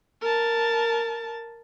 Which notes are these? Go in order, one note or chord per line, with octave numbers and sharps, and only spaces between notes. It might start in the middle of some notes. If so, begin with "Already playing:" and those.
A#4 A5